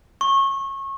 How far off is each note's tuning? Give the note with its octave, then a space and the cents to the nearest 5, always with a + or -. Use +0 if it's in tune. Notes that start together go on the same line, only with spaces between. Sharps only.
C#6 -25